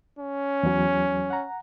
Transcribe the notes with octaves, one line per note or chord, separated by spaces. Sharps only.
C#4
E2 F#3
F#5 A#5